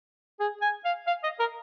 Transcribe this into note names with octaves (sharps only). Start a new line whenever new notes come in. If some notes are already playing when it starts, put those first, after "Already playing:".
G#4
G#5
F5
F5
D#5
A#4